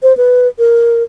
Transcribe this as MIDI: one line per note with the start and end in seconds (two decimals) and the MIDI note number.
0.03 0.16 72
0.17 0.48 71
0.59 1.03 70